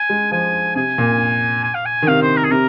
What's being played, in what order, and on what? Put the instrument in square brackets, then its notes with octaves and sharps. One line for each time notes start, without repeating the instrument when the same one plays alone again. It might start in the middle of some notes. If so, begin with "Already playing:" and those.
Already playing: [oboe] G#5
[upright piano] G#3
[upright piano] F3 [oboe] G#5
[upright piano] C3 [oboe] G#5
[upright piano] A#2
[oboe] G#5
F5
G#5
[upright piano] D#3
[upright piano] C3 [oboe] F5
[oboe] C5
A#4
G#4
[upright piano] C3 [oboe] A#4